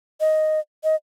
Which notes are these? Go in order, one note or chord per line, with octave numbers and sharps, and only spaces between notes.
D#5
D#5